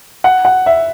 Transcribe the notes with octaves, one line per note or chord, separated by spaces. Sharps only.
F#5
F#5
E5